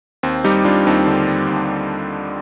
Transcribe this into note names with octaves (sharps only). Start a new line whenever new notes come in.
D#2 C4
G3 D#4 G4
G3 D4 F4
D#2 C4 D#4
D3
G3
D#2